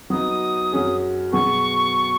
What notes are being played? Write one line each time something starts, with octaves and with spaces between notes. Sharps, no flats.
F#3 B3 D#4 D#6
F#2 F#3 C#4 G#4
B2 F#3 B3 G#4 C#6